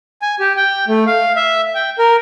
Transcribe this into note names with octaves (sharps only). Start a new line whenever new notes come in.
G#5
G4
G5
A3
F5
E5
G5
A#4